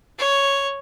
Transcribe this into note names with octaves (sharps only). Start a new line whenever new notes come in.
C#5